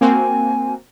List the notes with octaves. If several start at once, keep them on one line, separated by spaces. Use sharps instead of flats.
A#3 C4 F#4 G#5